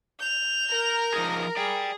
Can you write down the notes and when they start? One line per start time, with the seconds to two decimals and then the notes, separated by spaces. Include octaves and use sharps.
0.19 G6 F7
0.71 A#4
1.14 F3 D#4 G#4
1.57 G#4 D5 G5